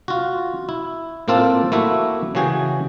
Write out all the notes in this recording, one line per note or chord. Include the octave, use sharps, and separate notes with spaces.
F4 F#4
E4
A2 A#3 C4 F4 A4
A3 A#3 E4 F#4 E5
C#3 E3 F#4 G#4 G5